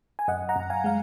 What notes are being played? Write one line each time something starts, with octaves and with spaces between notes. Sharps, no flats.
G#5
F#2 D#5 F#5
F#5 A#5
F#2
F5 G#5
G#3 F5